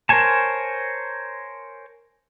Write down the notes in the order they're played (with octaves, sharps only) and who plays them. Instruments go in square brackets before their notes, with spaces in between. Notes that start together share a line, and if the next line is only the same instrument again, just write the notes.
[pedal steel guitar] A#4 C5 C#5 G#5 A5